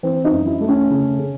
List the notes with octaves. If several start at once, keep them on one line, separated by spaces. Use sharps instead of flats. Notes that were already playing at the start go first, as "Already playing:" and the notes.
E3 C4
D#4
F#2
E4
A3
C#4
C#3
C#3